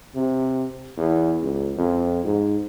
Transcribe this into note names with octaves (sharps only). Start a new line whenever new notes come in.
C3
E2
C#2
F2
G#2